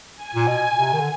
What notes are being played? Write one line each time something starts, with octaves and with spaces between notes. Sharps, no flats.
G#5
A#2
B2
C3
D#3
D3